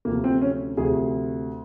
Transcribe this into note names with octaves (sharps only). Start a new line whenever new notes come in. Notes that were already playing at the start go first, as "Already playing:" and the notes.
D2 C3 F3 A#3
C4
C#4
D2 C3 F3 G#4